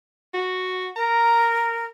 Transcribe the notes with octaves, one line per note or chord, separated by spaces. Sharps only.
F#4
A#4 A#5